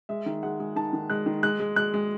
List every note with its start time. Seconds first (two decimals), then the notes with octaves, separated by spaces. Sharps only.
0.09 G#3 E5
0.26 D#3
0.43 G#3 F#5
0.60 G#3
0.76 D#3 A5
0.93 D#3
1.10 G#3 F#6
1.26 D#3
1.43 G#3 F#6
1.60 G#3
1.76 G#3 F#6
1.94 G#3